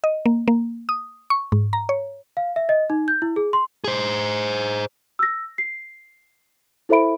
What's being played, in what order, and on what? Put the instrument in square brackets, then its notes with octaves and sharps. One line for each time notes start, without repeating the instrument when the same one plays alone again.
[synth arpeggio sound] D#5
A#3
A#3
D#6
C#6
G#2
A#5
C#5
[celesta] F5
E5
D#5
D#4
G6
E4
G#4
C6
[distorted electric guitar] G#4 C5
[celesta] E6 A#6
C7
E4 A4 C5 E5 B5 D7